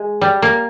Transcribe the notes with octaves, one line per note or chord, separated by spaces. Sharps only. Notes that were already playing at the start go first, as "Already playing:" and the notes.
Already playing: G#3
G3
A#3